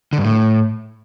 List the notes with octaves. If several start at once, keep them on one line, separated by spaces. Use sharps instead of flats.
D3
G2
A2